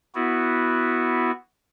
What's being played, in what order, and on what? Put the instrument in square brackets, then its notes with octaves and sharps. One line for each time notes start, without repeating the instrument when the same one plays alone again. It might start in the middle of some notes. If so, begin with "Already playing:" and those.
[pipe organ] B3 E4 F#4